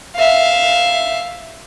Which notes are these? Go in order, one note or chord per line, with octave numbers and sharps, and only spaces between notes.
E5 F5